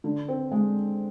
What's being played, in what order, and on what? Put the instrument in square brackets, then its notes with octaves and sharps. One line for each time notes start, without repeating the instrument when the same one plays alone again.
[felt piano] D3
C4
G#3